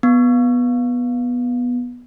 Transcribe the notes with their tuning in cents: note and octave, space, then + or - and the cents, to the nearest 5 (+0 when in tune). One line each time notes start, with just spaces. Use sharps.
B3 -10